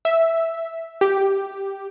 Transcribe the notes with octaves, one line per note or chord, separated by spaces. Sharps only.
E5
G4